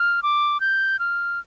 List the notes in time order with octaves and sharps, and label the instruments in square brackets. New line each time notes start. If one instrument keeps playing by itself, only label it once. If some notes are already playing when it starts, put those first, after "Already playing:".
Already playing: [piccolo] F6
D6
G6
F6